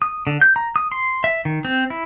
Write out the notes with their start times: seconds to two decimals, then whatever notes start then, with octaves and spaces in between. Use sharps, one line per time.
0.02 D#6
0.27 D3
0.41 G6
0.56 A#5
0.76 D#6
0.92 C6
1.24 E5
1.45 D#3
1.65 C4
1.90 E4